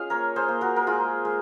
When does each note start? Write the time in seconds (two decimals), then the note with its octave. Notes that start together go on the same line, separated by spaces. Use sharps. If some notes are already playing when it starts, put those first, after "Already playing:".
Already playing: C#4 F4 G#4 D#5 F5
0.10 A#3 A#4 C#5
0.36 G#4 C5
0.48 A#3
0.61 F#4 A#4
0.76 A#4
0.87 G#3 F4 G#4
1.25 G#3